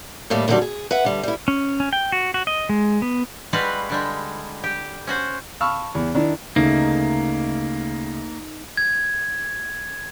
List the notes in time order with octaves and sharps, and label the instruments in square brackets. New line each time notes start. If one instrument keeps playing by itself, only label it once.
[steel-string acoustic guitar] A2 D#3 G3 A3 A#3
E2 D3 D#3 F#3 G3 D5
G#4
B4 E5 F#5
D3 G3
G3 E4
[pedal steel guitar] C#4
C#4
G5
F#4
F#4
D#5
G#3
B3
[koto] G3 G#3 F#4 B4 F5 F#5
D3 G3 G#3
G4
C#4 F#4 C5
[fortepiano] F5 A5 B5 C#6 E6 F6
E2
D#3 D4 E4
[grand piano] D2 C#3 A3 [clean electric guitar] A#3 [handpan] D#4
[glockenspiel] G#6